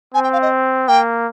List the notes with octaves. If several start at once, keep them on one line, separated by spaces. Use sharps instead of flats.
C4 G#5
G5
F5
D#5
A#3 G5